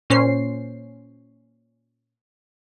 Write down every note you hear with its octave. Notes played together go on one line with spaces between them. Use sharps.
A#2 C#4 C5 C7